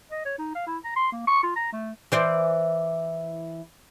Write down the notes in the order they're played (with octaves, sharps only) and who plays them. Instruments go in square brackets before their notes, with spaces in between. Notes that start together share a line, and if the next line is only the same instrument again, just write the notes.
[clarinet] D#5
C#5
D#4
F5
E4
A#5
C6
A#3
C#6
F4
A#5
A3
[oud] E3 C5 D5